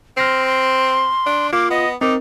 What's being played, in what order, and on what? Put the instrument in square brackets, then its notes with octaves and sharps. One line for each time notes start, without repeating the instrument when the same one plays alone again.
[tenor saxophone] C4 [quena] C6 [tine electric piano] F6 A#6 C7
[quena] C6
[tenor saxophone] D4
[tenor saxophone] A#3 [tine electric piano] F4 [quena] D6
[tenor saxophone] B3 [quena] D#5
[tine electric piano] C4 A#4 [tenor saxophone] D#4 [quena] D6